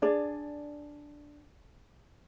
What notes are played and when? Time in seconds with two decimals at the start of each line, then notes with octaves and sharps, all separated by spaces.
0.02 D4 G#4 D5